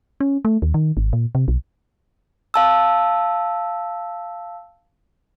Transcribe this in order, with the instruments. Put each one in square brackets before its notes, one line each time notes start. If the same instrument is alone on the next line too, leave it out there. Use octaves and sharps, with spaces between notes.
[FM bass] C#4
A3
D#2
D#3
G#1
A#2
C3
B1
[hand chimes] F5 A5 E6